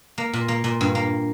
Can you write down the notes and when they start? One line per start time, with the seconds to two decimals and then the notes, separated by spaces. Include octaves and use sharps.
0.18 A#3
0.33 A#2
0.48 A#3
0.64 A#2
0.81 G2
0.95 A#3